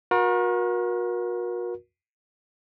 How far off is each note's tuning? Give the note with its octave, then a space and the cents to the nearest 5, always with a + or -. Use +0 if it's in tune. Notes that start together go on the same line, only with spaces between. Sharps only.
F#4 -35 A#4 +35